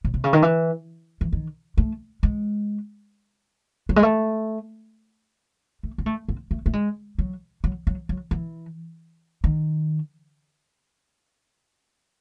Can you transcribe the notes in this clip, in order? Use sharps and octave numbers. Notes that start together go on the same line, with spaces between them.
A2
C3
C#3
D#3
E3
E3
D#3
A3
G#3
F#3
G#3
A3
A3
C4
A3
C4
A3
A3
G#3
F#3
F#3
F#3
F#3
E3
D#3